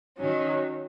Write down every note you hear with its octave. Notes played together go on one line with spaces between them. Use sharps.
D#3 F#3 C#4